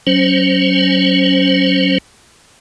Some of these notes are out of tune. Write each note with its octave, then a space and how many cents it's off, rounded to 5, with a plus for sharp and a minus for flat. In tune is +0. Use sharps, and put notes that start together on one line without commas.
F#3 +15 C#4 +0 C5 +0